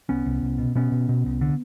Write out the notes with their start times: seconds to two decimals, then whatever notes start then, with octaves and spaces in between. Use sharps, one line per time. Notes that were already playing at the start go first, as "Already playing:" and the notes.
0.09 C2 B3 C#4
0.26 C2
0.42 C2
0.58 B2
0.75 B2 B3 C#4
0.92 B2
1.09 B2
1.26 C2
1.41 D3